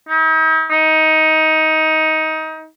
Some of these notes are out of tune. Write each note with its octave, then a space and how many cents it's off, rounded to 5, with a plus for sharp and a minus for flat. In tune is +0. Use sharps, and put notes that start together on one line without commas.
D#4 +45
D#4 +20